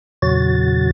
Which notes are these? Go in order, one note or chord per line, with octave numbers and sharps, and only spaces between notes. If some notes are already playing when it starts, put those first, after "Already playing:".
E2 A#2 C#3 F#3 F#4 A6